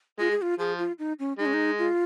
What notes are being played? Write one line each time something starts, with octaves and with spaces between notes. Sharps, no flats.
G#3 F4
G#4
F4
F3 G#4
F4
D#4
C#4
G#3 D#4
C#4
D#4
F4